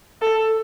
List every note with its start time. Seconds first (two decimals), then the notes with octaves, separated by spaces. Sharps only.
0.22 A4